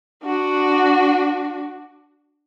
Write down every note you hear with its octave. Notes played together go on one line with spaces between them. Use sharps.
D4 F#4